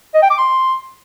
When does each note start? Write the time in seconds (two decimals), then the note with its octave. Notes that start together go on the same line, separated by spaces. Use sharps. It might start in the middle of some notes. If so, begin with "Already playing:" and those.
0.14 D#5
0.22 G5
0.30 D6
0.38 C6